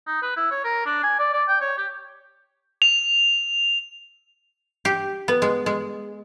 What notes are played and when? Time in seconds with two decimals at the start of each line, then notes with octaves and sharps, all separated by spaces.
0.07 D#4
0.22 B4
0.37 E4
0.51 C#5
0.64 A#4
0.86 D4
1.03 G#5
1.19 D5
1.33 D5
1.48 G5
1.61 C#5
1.78 G4
2.82 F7
4.85 G4
5.28 B3
5.42 G#3
5.66 G#3